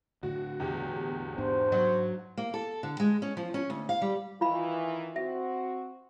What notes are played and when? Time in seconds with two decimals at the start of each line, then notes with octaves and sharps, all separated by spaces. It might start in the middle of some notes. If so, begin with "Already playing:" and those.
0.23 A2 D3 F#4
0.60 E2 B2 G4
1.38 G#2 D4 C5
1.72 F#3
2.37 A#3
2.54 A4
2.83 D3
3.00 G#3
3.22 C#4
3.37 F3
3.54 C#4
3.70 D2
3.89 F5
4.02 G3
4.41 D#3 E3 F4 F5 B5
5.16 C4 F#4 E5